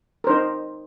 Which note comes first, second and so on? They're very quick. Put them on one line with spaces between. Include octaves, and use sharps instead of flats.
A#4 C5 D#4